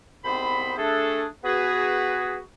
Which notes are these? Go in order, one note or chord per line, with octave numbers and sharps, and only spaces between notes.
C2 G#2 B3 C4 C5 B5
A3 D4 G#4 A4
B3 F#4 G#4 B4